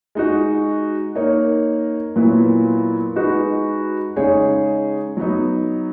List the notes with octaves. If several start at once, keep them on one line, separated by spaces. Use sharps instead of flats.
G#3 D#4 F#4
A#3 D#4 A#4 C#5
A#2 F#3 B3 E4 B4
G#3 D#4 F#4 B4
C#3 G#3 D#4 G#4 C#5
F#3 B3 D#4